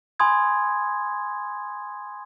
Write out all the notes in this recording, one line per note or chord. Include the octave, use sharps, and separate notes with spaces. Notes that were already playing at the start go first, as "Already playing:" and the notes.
G#5 B5 C6 D#6 G#6